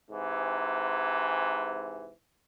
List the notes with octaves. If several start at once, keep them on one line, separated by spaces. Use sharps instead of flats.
G#2 C3 E3